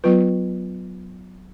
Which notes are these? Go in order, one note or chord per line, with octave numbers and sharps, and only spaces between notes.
F#3 B3 F4 B4